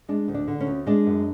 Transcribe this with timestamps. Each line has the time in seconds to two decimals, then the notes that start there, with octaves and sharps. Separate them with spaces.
0.08 G#3 D4
0.28 D2
0.34 D4
0.48 D3
0.60 C#4
0.67 D2
0.86 G#3 D4
1.07 F#2